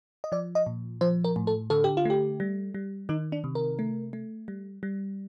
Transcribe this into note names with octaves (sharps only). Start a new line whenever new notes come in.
D#5
F3 D5
D#5
A#2
F3 C5
A#4
A2
A4
D3 A4
G4
F4
A3 G4
G3
G3
D#3 D#4
D4
C3
A#4
A3
A3
G3
G3